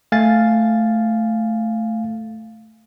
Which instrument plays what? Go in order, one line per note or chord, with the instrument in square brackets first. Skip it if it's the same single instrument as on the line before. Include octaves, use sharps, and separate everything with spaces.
[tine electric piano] A3 F5 G#5 A6